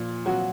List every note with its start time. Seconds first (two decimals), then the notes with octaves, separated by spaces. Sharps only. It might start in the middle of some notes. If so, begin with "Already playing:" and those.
Already playing: A#2 F3
0.26 F#3 F#4